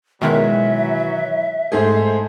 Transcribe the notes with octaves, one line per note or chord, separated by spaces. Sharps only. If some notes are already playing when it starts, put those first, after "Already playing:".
B2 D#3 E3 F#3 G#3 E5
G#2 A3 G#4 A4 C5